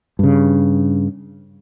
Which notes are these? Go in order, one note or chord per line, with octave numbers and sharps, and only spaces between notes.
G2 C#3